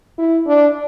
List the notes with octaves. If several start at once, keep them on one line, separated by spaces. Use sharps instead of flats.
E4
D4